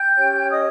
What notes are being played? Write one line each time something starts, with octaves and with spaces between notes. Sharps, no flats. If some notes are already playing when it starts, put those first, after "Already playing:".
Already playing: G5 G6
C#4 G4 C#5
D#5 D#6